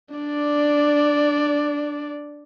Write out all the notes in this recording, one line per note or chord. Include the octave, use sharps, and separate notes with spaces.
D4 D5